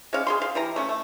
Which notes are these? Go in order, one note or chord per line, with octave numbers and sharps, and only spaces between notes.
G#3 C#4 F5
G#4 F5 C6
F5
E3 G3 A#5
A3 C#4
A3